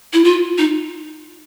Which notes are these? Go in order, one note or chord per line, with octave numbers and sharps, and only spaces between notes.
E4
F4
D#4